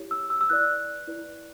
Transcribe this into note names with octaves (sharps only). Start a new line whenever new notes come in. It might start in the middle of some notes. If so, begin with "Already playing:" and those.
Already playing: E4 G4 C#5
E6
E6
E6
E4 B4 D5 F#6
E4 B4 D5